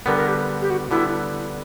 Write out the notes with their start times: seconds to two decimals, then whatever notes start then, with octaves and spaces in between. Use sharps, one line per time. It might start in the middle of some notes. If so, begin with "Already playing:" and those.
0.06 D3 G3 B3 A#4
0.17 A#4
0.28 G4
0.62 G4
0.70 F#4
0.91 D3 G3 B3 E4